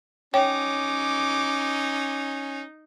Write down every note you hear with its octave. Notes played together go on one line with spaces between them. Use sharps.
C#4 D#4 C#5 G5 D6